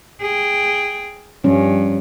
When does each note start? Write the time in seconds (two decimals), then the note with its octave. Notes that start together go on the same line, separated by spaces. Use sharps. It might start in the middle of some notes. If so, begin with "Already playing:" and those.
0.21 G#4 G5
1.44 G2 F3 G3 C#4